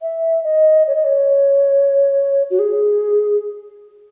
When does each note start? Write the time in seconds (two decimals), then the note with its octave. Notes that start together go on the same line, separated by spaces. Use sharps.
0.02 E5
0.44 D#5
0.87 C#5
0.95 D#5
1.05 C#5
2.50 F#4
2.59 G#4